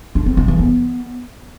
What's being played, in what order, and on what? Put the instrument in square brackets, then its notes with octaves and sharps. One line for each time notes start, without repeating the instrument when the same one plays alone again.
[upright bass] D4
C4
D#3
E3
B3